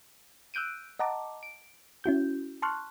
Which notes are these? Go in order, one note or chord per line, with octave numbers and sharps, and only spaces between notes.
E6 F#6 G6 D7 D#7
D#5 F#5 A5 A#5 D6
D7
C#4 E4 F#4 G6
A5 C6 C#6 F6 F#6